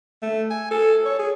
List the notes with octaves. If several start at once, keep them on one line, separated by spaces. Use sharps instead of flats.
A3
G#5
A4
C#5
G#4